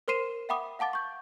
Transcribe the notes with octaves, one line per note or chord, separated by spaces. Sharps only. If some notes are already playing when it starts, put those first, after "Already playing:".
A#4 C5 C6 C7 D#7 E7
E5 F#5 G5 B5 D6 D#6
F5 F#5 A5 D6 A6
C#6 G6